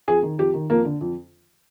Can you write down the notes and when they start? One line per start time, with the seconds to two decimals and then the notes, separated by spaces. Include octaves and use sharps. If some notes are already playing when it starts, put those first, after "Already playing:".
0.08 F2 G#4
0.23 D#3
0.38 F2 G4
0.54 D#3
0.70 F2 A#3
0.85 D3
1.01 F2